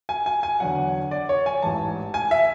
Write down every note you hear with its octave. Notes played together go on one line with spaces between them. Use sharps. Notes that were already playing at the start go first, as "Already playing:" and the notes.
G#5
G#5
G#5
E2 D3 F#3 F#5
D5
C#5
G#5
A1 G#2 E3 A5
G#5
E5